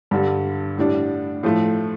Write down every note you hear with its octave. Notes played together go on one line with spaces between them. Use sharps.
G2 D3 G3
A2 G3 D4
A2 F3 A3